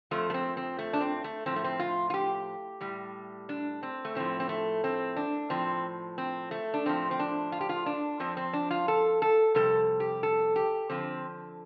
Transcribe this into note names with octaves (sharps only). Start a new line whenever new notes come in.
F2 F3 A3
A3
C4
C4
A3
D4
C4
A3
A2 F3 C4
A3
C4
F4
F4
G4
A2 G3
D4
C4
A3
A2 F3 C4
C4
A3
C4
D4
A2 F3 C4
C4
A3
D4
A2 F3 C4
C4
D4
F4
G4
F4
D4
F2 F3 C4
C4
D4
F4
A4
A4
F2 C3 G3 A4
G4
A4
G4
D3 F3 C4